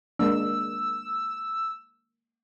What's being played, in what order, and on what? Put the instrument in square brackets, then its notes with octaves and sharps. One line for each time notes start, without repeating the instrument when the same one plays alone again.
[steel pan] G#3 A#3 D4 [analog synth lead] E6